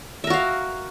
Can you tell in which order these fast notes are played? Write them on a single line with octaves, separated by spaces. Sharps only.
E5 A#4 F#4 F5